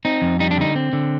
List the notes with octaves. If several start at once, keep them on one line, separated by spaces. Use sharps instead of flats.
C4 D#4
F2
G3 D#4
D4
D3 D#4
C4
D3